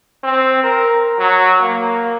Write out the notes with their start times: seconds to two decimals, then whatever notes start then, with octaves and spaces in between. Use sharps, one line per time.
0.23 C4
0.64 A#4
1.19 F#3
1.61 A#3